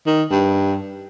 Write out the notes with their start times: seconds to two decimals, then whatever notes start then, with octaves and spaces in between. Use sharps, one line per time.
0.07 D#3
0.31 G2